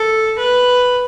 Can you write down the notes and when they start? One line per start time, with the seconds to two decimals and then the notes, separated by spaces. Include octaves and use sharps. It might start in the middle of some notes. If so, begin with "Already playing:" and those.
Already playing: A4
0.38 B4